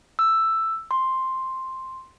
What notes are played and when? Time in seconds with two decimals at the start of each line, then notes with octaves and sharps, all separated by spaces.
0.19 E6
0.91 C6